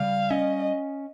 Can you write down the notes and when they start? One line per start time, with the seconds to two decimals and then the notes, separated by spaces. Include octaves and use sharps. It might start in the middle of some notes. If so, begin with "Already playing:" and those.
Already playing: C#3 G3 F5
0.30 C#4 D#5